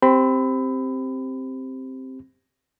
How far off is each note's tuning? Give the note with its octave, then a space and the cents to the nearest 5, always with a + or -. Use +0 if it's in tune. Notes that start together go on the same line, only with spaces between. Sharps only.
C4 +0 G4 +0 B5 +25